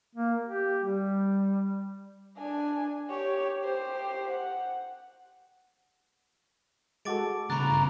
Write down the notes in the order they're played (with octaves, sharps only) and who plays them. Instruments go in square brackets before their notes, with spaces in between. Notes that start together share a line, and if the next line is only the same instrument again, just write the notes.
[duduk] A#3
G4
G3
[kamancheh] D4 G#5
G4 C#5
G4 C5
F#5
[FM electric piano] G#3 F#4 A4 [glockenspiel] D6 A6 D7
[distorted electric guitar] E2 C#3 [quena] A#5 [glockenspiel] B5 C#6 F#6 [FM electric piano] A6
[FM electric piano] G1